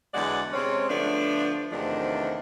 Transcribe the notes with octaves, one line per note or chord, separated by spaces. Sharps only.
E2 D3 F#3 G#3 D5 F#5
C3 G#3 C4 C#4 C#5
D3 F3 A3 B3 D4
E2 C3 D#3 F3 A3 D4